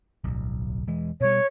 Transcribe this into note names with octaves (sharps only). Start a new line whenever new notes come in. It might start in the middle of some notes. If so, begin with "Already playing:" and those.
D1 B1
E1 E3 G#3
B2 G3 C#5